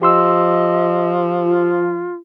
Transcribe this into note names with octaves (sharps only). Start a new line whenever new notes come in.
F3 G4 D#5 C6 E6
F4